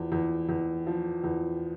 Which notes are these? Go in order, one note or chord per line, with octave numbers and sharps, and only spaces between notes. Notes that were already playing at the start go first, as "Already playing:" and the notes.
Already playing: E2 F3
E2
E2
F3
E2